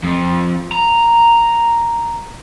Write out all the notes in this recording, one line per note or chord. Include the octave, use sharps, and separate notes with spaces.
F2
A#5